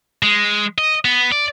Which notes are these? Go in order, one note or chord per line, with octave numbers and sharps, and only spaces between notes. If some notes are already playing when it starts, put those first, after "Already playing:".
G#3
D#5
B3
D5